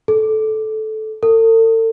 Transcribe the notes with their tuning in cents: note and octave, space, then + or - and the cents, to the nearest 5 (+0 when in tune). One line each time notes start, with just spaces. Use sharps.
A4 -15
A4 +40